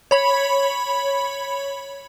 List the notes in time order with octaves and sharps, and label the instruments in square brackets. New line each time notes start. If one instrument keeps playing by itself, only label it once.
[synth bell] C#5 B5